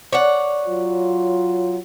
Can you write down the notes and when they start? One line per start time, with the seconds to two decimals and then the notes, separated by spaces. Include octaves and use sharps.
0.12 C#5 D5 F#5
0.68 F#3 F4